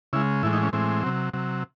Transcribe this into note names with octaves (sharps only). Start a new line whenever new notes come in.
C#3 G#3 E4
A2 E3 G#3 E4
D#4
C#4
A2 E3 G#3 C4
C3 F#3
C3 F#3